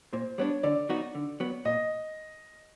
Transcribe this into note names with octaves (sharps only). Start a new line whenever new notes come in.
A#2 C5
G3 B3 D4 C#5
D3 D5
F#3 B3 D#4 F#4
D3
F#3 B3
A#2 D#5